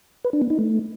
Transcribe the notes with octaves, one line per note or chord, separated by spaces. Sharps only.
B4
D4
B3
D#4
A3